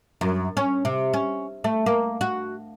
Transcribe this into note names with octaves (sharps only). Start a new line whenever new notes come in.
F#2
C#4
C3
C#4
A3
A#3
F#4